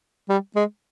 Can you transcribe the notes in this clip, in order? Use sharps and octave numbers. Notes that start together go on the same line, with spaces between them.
G3
G#3